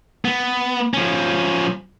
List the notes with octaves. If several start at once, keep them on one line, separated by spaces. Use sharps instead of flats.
B3
F3 C#4